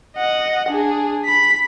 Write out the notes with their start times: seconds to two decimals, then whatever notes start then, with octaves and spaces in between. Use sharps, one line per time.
0.17 D#5 F#5
0.68 D4 G#4
1.25 B5 B6